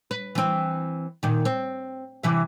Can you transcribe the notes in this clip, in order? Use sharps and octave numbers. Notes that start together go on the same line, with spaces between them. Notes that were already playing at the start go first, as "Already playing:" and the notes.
B4
E3 C4
A#2 D#3
C4
C3 E3 E5